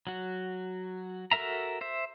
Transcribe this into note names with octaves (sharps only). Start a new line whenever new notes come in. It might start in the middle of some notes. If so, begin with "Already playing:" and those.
F#3 F#4
F#4 A4 A#4 E5 A#5
C5 E5